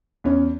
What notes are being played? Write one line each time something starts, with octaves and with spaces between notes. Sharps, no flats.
E2 C#4